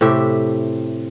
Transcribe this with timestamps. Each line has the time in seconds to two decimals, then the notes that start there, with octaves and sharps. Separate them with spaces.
0.01 A2 C3 G4 E5